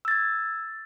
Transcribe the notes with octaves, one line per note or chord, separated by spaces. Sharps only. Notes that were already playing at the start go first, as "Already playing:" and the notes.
E6 G#6 A6